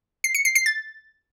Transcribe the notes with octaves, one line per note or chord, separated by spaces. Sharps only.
C7
C#7
C7
C7
A6